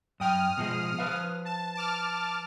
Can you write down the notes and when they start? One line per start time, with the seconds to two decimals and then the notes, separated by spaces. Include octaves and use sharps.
0.20 F#2 G5 D#6 F6
0.57 B2 F3 G#3
0.99 F3 B4 F5
1.45 A5
1.75 A5 D6 F6